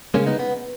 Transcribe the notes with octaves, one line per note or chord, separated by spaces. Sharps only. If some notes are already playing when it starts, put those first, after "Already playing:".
C#3 G#3 A#3 C#4
B3 D#4
B3